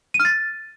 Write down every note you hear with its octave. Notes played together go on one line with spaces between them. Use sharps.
D#7
F6
A6